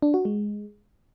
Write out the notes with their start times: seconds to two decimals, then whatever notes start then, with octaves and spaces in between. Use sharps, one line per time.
0.02 D4
0.14 F#4
0.25 G#3